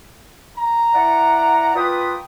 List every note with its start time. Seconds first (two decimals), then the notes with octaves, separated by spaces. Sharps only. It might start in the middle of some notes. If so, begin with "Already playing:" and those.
0.56 A#5
0.94 E4 D5 F#5
1.75 A#3 F4 B4 G5 D#6